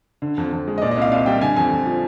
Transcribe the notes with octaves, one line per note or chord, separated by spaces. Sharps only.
D3
F2
F2
G#3
D#5
A#2 D5
D#5
C2 F5
C2 F5
G3 G5
D3 G#5
F2 G#5
F2
F3